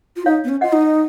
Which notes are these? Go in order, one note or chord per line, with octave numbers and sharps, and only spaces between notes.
F4
D#4 C#5 F5
B3
C#4
F4 D#5 F#5
D#4